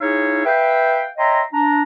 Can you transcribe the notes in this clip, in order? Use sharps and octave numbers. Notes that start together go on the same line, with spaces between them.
D#4 E4 G#4 C#5 E5 F5
B4 E5 F5 G5
C#5 D#5 E5 G5 A#5 C6
D4 A#5